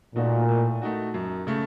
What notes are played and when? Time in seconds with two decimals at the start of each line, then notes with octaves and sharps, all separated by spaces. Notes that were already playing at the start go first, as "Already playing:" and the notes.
0.15 A#2 A3 D#4 F#4
0.49 A2
0.82 A3 D#4 F#4
1.14 F#2
1.47 C#3 A3